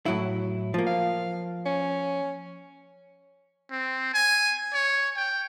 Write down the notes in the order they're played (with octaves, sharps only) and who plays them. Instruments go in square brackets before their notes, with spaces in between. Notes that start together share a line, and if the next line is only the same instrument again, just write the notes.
[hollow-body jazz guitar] A2 F#3 E4
F3 A#3
[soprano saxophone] F5
C#4
[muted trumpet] C4
G#5
C#5
G5